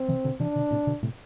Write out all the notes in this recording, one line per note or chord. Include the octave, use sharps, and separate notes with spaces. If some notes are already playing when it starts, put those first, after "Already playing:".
Already playing: C4
C3 E3
B2 D3
C3 E3 D4
B2 D3
A2 C3
B2 D3
A2 C3